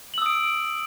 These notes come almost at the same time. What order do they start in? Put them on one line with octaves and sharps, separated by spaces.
F#7 E6 D#6 D7